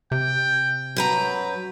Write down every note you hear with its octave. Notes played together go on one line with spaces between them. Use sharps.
C3 G5
F#2 F#3 B4 G5 A#5